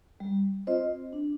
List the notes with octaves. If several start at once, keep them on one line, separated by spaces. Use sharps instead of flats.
G3
C4 F4 C5 D#5
D4